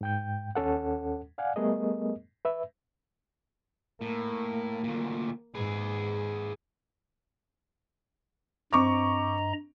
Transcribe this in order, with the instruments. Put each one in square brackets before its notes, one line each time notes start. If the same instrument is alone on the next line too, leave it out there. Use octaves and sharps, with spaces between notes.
[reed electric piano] G#2 G5 G6
D#2 C#4 A4 F#5
D5 F5 F#5 G#5
G3 A3 B3 G#4 A#4 D#5
B4 E5
[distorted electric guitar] A2 [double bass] A#3
[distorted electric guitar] D2 A#2
[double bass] G#2 [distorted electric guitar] G#4 B4
[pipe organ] G2 D#5 A#5 [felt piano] C4 C#6 D6